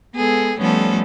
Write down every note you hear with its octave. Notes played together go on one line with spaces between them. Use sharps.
G#3 B3 G#4 A4
F3 G3 A3 B3 C#4 A4